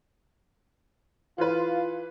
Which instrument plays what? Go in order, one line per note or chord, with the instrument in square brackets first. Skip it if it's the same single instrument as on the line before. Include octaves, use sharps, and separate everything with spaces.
[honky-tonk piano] E3 B4 [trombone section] F4